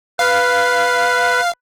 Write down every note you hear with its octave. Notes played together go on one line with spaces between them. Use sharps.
B4 F5